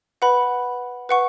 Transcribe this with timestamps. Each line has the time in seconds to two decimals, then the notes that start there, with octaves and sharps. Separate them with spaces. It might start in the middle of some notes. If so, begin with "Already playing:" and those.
0.22 B4 F#5 B5
1.09 B4 F#5 C#6